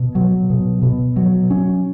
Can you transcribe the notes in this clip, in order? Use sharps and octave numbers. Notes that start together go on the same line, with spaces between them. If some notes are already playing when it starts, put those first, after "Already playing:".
Already playing: B2
F#3
B2
B2
F#3
C#4